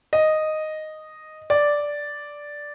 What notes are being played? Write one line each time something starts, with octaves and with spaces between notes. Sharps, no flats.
D#5
D5